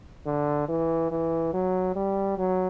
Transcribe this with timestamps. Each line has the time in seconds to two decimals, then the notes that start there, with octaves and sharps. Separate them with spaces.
0.26 D3
0.68 E3
1.11 E3
1.53 F#3
1.96 G3
2.38 F#3